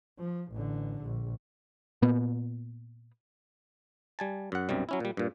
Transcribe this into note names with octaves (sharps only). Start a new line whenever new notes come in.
F3
A1 D3
A#1
A#2 B3
G3 G#5 A5
F#2 F#5
B1 F#2 C3 G3
F#3 C#4 E4
A#2 G3
G2 A#2